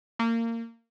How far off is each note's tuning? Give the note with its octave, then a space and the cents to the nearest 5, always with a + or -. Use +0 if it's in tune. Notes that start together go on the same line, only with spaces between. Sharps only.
A#3 -25